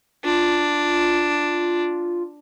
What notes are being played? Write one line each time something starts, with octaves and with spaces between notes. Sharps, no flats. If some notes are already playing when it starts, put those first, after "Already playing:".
D4 F4